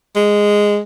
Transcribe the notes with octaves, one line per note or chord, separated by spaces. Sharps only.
G#3